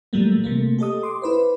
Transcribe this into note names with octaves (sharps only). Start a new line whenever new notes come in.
A#2 E3 F#3 G3 A3 A#3
C3 A3 A#3
G4 A4 D#5 D#6
C6 D6
E4 B4 C5